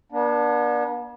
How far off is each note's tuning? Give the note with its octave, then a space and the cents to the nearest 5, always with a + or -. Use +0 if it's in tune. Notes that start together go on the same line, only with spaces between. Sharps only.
B3 -45 D4 +5